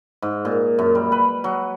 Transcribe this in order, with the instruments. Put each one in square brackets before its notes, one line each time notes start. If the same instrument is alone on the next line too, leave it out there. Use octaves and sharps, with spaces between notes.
[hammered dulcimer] G#2
A#2
F#2
G3
B4
F#3